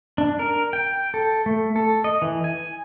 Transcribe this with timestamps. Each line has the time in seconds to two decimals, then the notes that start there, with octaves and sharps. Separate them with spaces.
0.18 D4
0.39 A#4
0.73 G5
1.14 A4
1.46 A3
1.76 A4
2.04 D#5
2.22 E3
2.44 G#5